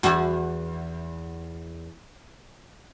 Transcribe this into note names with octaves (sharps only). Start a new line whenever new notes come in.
E2 F#4